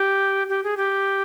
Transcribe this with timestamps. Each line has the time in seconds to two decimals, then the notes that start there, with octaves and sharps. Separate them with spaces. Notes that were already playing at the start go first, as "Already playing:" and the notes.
Already playing: G4
0.49 G4
0.64 G#4
0.77 G4